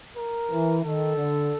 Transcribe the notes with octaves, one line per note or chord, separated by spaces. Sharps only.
A#4
E3
D#3 A4
D3